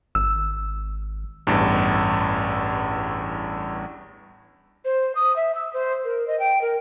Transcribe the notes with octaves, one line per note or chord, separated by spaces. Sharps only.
G#1 E6
A1 E2 G2
C5
D#6
E5
E6
C5
A#4
D#5
G5
A#4